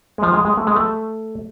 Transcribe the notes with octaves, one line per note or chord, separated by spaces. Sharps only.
G#3
F3
G#3
G#3
A3
G#3
A3